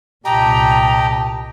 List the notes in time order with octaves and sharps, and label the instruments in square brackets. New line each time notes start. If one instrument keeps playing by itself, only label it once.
[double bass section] C2 A#2 [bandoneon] G4 D#5 G5 [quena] A5 [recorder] A#5